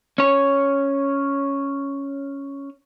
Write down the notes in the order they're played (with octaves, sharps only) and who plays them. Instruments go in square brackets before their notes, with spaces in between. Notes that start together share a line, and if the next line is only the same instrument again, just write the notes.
[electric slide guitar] C#4 C#5